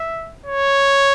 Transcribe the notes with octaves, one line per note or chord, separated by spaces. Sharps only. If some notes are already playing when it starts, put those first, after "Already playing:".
Already playing: E5
C#5